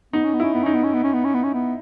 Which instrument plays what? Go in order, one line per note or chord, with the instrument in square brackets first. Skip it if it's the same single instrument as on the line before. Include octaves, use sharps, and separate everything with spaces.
[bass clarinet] B3 [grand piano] D#4
[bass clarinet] C#4
B3
[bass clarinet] C#4 [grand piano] E4
[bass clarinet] B3
[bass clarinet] C#4 [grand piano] D#4
[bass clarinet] B3
C#4
B3
C#4
B3
C#4
B3
C#4
B3